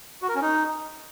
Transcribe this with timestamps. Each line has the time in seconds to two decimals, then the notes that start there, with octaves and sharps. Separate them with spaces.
0.22 F#4
0.29 A#4
0.35 C#4
0.42 D#4